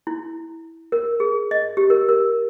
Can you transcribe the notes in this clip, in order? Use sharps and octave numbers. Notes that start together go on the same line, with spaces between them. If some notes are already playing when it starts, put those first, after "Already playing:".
E4
A#4
G#4
D#5
G4
A#4
A#4